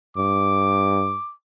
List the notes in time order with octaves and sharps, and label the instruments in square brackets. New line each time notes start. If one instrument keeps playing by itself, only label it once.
[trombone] G2 [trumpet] D6